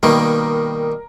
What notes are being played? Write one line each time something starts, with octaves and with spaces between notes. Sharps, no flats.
B2 D#3 G3 A#3 A#4